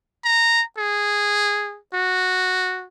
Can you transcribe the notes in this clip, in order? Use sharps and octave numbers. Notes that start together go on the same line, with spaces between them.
A#5
G#4
F#4